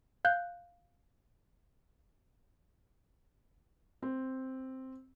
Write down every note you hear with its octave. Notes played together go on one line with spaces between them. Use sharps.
F5 F#6 G6
C4